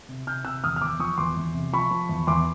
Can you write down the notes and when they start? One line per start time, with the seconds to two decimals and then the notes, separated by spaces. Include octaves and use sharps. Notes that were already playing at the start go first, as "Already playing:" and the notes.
0.09 C3
0.27 C3 F6 G6
0.45 C3 E6 F#6
0.64 E2 D#6 F6
0.76 F6
0.81 E2 D6 E6
0.99 F3 C#6 D#6
1.18 E2 C6 D6
1.37 E2
1.54 C3
1.73 F3 B5 C#6
1.91 F3
2.09 E2
2.27 E2 C6 D6